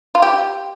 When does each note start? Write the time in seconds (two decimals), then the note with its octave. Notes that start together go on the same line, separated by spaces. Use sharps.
0.15 F4
0.22 G4